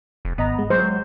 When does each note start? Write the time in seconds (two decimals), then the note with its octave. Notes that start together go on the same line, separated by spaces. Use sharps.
0.25 F1
0.38 G#1 B3 D#5 A#5
0.59 G#3
0.70 F#3 G#3 C5